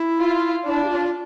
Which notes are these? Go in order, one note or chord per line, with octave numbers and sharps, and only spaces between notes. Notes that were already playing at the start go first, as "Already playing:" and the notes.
Already playing: E4
F4
D4 E4
G4
F4